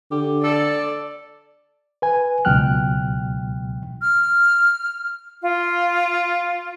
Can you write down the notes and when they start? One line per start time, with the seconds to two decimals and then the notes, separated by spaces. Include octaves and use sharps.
0.11 D3 G4
0.44 A4 D5
2.02 B4 G#5
2.45 C#2 B2 F#3 G5 F6 F#6
4.02 F6
5.42 F4